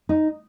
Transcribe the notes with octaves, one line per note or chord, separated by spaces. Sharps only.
D#4